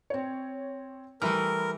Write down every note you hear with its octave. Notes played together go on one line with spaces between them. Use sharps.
C4 C#5
E3 G3 A3 A#4 B5 F6